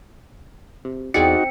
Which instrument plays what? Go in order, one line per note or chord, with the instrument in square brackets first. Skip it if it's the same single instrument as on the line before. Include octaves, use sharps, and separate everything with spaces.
[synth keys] C3
[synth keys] E2 G#4 D5 [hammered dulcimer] C4 [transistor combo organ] D#4 F#4 [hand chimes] C#7